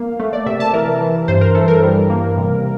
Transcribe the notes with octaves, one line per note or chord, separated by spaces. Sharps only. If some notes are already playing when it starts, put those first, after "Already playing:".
Already playing: A#3 F5
A3
D5
C3 E5
A5
E3 A#4
E3
G2 C5
A#4
E3 A4
A#4
G3
A#3
C3